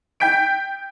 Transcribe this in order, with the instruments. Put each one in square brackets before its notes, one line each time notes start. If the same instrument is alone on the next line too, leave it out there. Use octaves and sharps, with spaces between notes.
[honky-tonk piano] G5 G6 B6 D7